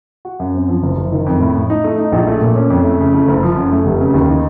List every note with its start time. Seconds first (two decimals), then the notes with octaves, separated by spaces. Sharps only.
0.25 F#4
0.39 F#2
0.54 C4
0.68 F3
0.83 F#1
0.97 F#1
1.12 D#3
1.26 F2
1.40 A2
1.55 A2
1.70 D#4
1.84 A3
1.98 D#4
2.12 A#1
2.27 A3
2.41 A#2
2.55 C#4
2.70 F2
2.84 A3
3.00 C#3
3.14 A3
3.28 F#1
3.43 F3
3.56 F#2
3.72 A3
3.85 F1
4.00 C#3
4.14 D#2
4.29 D#4